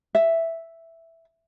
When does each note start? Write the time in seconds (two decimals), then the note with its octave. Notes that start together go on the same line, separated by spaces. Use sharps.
0.15 E5